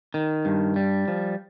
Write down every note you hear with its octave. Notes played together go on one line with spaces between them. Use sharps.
D#3
G2
G3
F3